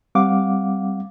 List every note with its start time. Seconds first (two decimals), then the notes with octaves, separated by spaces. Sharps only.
0.15 G3 C4 F5 F#5 D6